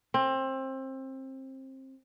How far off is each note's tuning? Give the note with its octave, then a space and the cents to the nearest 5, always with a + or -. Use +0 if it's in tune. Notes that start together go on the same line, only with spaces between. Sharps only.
C4 +25